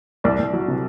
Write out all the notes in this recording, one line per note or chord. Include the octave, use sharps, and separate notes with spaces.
C2 D5
C2
F#3
C3